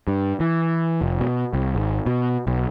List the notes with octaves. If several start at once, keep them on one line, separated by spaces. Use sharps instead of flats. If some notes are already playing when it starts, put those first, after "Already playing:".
G2
E3
F1
B2
C2
G#1
B2
B1